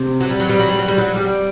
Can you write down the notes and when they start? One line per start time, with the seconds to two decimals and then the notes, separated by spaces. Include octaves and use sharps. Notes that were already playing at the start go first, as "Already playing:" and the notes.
Already playing: C3
0.20 F#3
0.30 G3
0.40 F#3
0.49 G3
0.59 F#3
0.69 G3
0.79 F#3
0.88 G3
0.98 F#3
1.15 G3